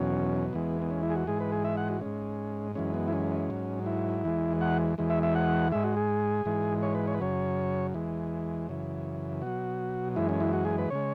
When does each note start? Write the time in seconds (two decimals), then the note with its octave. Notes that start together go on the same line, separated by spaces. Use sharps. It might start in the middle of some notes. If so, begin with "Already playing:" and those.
Already playing: E2 B2 F#3 C#4
0.53 E2 E3 G#3 B3
0.82 B3
0.91 C#4
1.03 E4
1.10 G#4
1.15 F#4
1.27 G#2 E3 G#3 G#4
1.40 B4
1.52 G#4
1.65 E5
1.77 F#5
1.89 F#4
2.01 G#2 G#3 C#4
2.75 F#2 E3 G#3 C#4
2.94 B3
3.08 E4
3.13 C#4
3.50 G#2 F#3
3.86 E4
4.24 E2 E3 G#3
4.61 F#5
4.98 E2 E3 G#3
5.10 E5
5.23 E5
5.35 F#5
5.72 G#2 G#3 E5
5.84 F#4
5.97 G#4
6.45 G#2 E3 G#3
6.83 C#5
6.95 B4
7.07 C#5
7.14 B4
7.19 F#2 C#3 F#3 C#5
7.94 E2 E3 G#3
8.68 F#2 C#3 E3
9.42 B2 F#3 F#4
10.16 F#2 E3 G#3 E4
10.29 C#4
10.40 E4
10.53 F#4
10.65 G#4
10.78 B4
10.90 C#3 G#3 C#5